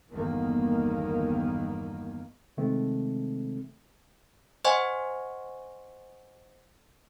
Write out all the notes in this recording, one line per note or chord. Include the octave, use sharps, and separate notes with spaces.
G1 E2 D#3 A#3 B3
C3 D#3 G#3 A3 C4
C5 D#5 F#5 G#5 C6 C#6